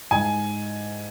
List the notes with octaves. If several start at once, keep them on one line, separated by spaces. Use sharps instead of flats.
G#2 G#5